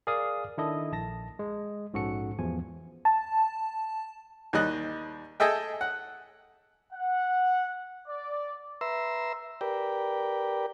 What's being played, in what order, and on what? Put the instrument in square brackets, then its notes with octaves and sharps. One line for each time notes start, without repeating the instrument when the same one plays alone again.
[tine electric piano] G#4 A#4 D5 F5 D#6
D#3 D4 E4 A4 D#5
A#1 A5 A#6
G#3
A#1 G#2 C#4 F#4 A4 C#7
E2 F3 G#5
[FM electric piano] A5
[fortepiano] D#2 G3 D#5 F#6
G#4 A4 D#5 E5 G5
F#5
[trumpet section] F#5
D5
[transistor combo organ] B4 E5 A#5 C6 E6
G4 A#4 B4 D5 G5